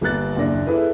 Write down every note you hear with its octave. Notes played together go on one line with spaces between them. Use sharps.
G1 G3 A#3 F#6 A6
F#1 D#2 D4 A#6
E4 G#4 A4 B4